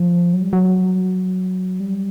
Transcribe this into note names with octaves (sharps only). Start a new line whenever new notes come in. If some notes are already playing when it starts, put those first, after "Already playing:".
Already playing: F3
F#3
G3
F#3
G3